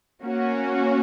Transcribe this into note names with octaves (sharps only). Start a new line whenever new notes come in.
A#3 C#4 F#4